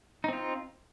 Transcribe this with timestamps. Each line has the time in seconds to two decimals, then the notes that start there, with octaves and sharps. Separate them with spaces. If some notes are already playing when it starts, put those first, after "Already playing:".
0.24 D#4
0.28 C4
0.33 F4